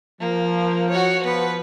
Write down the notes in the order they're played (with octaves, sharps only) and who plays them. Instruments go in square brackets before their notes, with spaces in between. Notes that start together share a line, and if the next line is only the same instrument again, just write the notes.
[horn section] F3 [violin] A#3
[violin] F#4 C#5
[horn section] F3 B3 [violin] B4